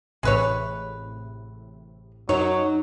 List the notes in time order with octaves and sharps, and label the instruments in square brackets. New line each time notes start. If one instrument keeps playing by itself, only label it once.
[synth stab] A1 A2 C3 [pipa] G#3 B4 C#5
[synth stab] F#2 [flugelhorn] F#3 [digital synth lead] D#4 [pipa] C#5